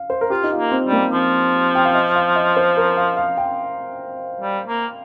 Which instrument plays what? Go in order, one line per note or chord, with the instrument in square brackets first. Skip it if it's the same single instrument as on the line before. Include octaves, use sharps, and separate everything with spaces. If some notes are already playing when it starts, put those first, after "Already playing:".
Already playing: [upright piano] F5
C5
A#4
[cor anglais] F4 [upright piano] G4
[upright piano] D#4
F4
[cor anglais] A#3
[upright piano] C4
[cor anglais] G3
[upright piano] A#3
[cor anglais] F3 [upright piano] C4
[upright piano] G5
F5
D#5
F5
D#5
C5
A#4
F5
F5
G5
[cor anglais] G3
A#3